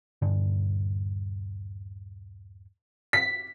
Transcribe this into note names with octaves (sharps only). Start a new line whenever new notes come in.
D#1 G2 D3
B6